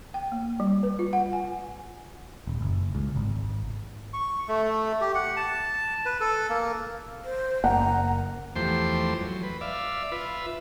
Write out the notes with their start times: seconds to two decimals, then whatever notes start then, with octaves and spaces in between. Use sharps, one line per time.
0.14 G5
0.32 A#3
0.60 G3
0.83 B4
0.99 F4
1.13 F#5
1.33 G#5
2.47 D#1
2.61 F#1
2.95 C#2
3.16 G#1
4.13 C#6
4.48 A3
5.01 G4
5.15 F#5
5.36 A5
6.05 B4
6.20 A4
6.50 A#3
7.24 C5
7.64 F#1 A#3 F#5 A#5
8.56 E2 F3 A3 G4 C5 C6
9.20 F#3
9.43 B4
9.61 D5 E5 F5
10.12 F4 B4 E5